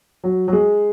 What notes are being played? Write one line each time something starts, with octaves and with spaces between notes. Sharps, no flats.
F#3
F#3
G#3